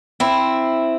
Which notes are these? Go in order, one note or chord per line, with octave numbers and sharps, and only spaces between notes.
C4 E4